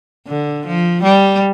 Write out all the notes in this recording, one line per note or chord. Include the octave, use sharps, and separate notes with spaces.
D3
F3
G3